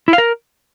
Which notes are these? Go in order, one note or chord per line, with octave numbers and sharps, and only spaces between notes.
E4
F5
A#4